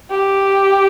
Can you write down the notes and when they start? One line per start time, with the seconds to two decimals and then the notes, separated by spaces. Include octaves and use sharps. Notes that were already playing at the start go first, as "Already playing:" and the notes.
0.10 G4